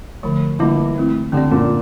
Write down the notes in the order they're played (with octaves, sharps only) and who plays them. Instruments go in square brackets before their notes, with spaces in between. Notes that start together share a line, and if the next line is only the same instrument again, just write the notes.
[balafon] D3 F3 A3
[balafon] D3 G3 A#3 D4 F4 [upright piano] E3
[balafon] A3 C4 E4
[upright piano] D3 [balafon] C4 G4 D5
[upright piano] A#2